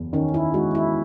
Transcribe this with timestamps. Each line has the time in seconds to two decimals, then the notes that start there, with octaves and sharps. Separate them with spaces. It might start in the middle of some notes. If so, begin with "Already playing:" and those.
Already playing: F#1 E2
0.13 D#3 C#4
0.34 E4
0.54 G#3 F#4
0.75 E4